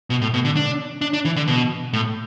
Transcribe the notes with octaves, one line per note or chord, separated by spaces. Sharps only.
B2
A2
B2
D3
D4
D4
D4
E3
D3
B2
A2